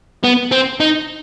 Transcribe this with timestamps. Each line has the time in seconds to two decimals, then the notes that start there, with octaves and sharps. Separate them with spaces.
0.24 B3
0.52 C4
0.80 D#4